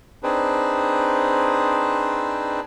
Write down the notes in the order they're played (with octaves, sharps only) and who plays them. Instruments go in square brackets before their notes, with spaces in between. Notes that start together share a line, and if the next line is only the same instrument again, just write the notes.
[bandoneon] C4 D4 D#4 G#4 B4 C5